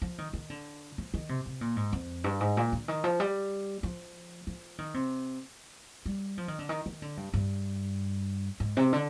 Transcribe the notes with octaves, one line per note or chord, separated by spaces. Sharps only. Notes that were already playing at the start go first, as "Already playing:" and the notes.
F3
D#3
D#3
D3
F3
D#3
C3
C3
A#2
G#2
F2
G2
G#2
A#2
D3
D#3
F3
G3
F3
F3
D#3
C3
G3
F3
D#3
D3
D#3
D#3
D3
G2
G2
G#2
C3
D3